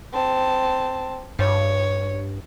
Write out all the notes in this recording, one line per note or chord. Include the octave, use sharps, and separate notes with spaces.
C4 A5
G2 C#5